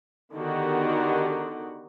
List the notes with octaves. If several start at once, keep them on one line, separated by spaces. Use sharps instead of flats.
D3 D#3 B3 D#4 F#4 G4